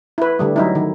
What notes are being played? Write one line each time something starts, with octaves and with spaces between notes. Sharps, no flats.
E4 B4
D3 G3 A3
F#3 D#4 E4
D#3